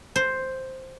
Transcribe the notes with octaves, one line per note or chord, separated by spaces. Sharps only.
C5